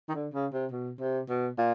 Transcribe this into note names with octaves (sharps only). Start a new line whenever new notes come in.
D#3
D3
C#3
C3
B2
C3
B2
A#2